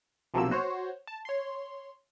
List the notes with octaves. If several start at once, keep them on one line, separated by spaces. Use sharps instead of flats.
B1 C3 F3 F#3 A#3 E6
F#4 C5 C#5
A5
C#5 C6